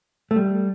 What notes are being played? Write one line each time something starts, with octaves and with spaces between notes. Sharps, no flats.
A3
G3